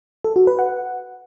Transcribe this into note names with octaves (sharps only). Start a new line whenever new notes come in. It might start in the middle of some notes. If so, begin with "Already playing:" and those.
A4
F#4
B4
F#5